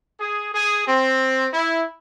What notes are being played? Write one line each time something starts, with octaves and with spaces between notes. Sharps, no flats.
G#4
G#4
C4
E4